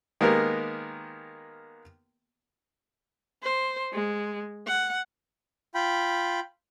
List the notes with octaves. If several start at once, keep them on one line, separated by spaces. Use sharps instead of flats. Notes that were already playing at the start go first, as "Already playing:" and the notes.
D#3 G#3 A#3 B3 G4 A#4
C5
G#3
F#5
F4 G5 B5